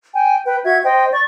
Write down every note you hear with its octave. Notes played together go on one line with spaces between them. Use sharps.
G5 G#5
B4 G5
F#4 E5 G#6
C5 D#5 G5
D5 C#6